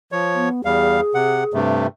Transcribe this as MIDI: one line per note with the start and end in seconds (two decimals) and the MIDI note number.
0.12 0.49 53
0.12 0.49 73
0.35 0.62 59
0.65 1.01 40
0.65 1.01 55
0.65 1.59 68
0.65 1.01 77
1.15 1.44 48
1.15 1.44 78
1.54 1.87 43
1.54 1.87 48
1.54 1.87 57